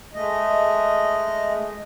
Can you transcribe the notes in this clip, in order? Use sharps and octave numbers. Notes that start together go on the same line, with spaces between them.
G#3 A3 D#5